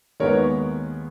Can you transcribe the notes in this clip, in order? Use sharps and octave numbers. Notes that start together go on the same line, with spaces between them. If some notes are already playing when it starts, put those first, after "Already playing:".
D#2 D#3 G#3 B3 A#4 C#5